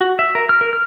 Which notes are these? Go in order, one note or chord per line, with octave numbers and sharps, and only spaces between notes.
F#4
E5
A#4
F6
A#4
F6